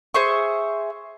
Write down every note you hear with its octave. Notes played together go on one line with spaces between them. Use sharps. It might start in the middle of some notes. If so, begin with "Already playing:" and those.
G#4 C5 E5 C#6